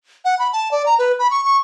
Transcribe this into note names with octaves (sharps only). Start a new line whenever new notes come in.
F#5
B5
A5
D5
A#5
B4
B5
C#6
C#6